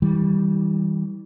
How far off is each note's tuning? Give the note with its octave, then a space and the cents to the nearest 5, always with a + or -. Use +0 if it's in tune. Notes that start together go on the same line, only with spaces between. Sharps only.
E3 -40 G3 +0